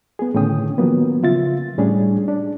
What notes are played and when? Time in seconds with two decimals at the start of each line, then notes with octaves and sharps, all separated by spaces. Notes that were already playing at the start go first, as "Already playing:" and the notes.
0.19 B3 G#4
0.34 A2 D3 D#3 C#4 G5 D#6
0.78 D#3 F3 F#3 A#3 B3
1.23 C#3 F4 E5 A6
1.78 A2 G3 C#4 D4 G#4
2.28 D4